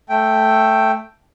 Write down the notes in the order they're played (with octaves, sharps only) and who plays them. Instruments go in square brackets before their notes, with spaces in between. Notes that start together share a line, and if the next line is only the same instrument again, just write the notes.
[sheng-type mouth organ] A3 G5